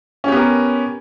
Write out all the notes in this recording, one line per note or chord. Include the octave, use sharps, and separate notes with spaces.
B3 C#4 G4 A#4